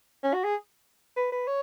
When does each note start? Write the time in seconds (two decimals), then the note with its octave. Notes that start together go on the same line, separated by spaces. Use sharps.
0.23 C#4
0.34 F#4
0.44 G#4
1.17 B4
1.32 B4
1.47 C#5